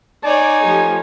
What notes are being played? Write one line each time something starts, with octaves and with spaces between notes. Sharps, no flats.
D#4 C#5 D5 G#5
F3 A3 G4